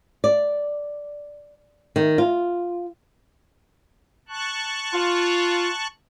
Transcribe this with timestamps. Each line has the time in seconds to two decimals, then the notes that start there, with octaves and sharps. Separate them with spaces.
0.24 D5
1.96 D#3
2.18 F4
4.29 A5 C#6 F#6
4.93 F4